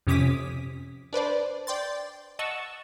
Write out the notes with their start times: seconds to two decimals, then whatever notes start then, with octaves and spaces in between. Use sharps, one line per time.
0.07 F2 C3 C#4 D6 D#6 B6
1.13 D4 B4 C5 D5
1.67 D5 G5 C6 A6
2.39 D#5 F#5 A5 C#6 E6